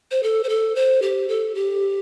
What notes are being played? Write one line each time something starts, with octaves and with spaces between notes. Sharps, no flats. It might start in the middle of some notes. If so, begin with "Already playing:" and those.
C5
A4
C5
A4
C5
G4
A4
G4